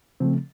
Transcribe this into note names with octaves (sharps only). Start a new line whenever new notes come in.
C#3 F3 A3 C4